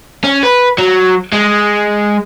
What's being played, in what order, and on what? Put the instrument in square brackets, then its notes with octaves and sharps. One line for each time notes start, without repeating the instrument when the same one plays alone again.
[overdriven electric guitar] C#4
B4
F#3
G#3